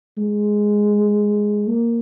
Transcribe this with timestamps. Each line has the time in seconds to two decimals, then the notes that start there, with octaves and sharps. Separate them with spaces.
0.17 G#3
1.67 A#3